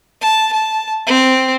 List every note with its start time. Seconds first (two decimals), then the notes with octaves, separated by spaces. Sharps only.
0.21 A5
0.53 A5
1.07 C4